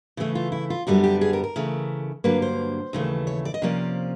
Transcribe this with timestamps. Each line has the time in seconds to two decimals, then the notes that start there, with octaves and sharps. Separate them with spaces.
0.17 C#3 E3 A3 E4
0.35 F4
0.52 E4
0.70 F4
0.87 F#2 D3 G3 B3 F#4
1.04 G4
1.21 G#4
1.33 A#4
1.44 A#4
1.56 C#3 E3 A3
2.24 G2 D3 F#3 A#3 B4
2.42 C5
2.93 D#2 C#3 E3 A3
3.27 C#5
3.45 D5
3.54 D#5
3.62 C3 F3 A#3 C#4 D5